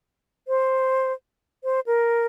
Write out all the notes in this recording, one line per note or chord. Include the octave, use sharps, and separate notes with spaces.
C5
C5
A#4